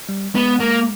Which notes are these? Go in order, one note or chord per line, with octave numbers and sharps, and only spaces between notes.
G3
G#3 B3
A#3